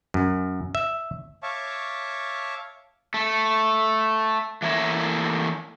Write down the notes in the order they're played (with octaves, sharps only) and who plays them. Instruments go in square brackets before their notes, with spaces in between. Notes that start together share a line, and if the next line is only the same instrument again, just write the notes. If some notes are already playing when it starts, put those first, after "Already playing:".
[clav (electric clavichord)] F#2
E5
[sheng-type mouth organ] C#5 E5 F5 A5 C#6 D6
[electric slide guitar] A3
E3 A3 A#3 E4 C#5 E5